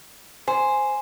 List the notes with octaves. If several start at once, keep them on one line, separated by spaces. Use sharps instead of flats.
C5 G#5